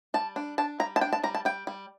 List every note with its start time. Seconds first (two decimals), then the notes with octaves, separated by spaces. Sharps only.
0.14 G3 A5
0.36 D4
0.58 D4 A5
0.80 G3 A#5
0.96 A5
1.01 D4 G5
1.13 A5
1.23 G3 A#5
1.35 A5
1.45 G3 G5
1.67 G3